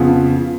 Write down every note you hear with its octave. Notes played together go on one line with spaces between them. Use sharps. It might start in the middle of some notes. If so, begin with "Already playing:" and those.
Already playing: F2 C#3 F3 B3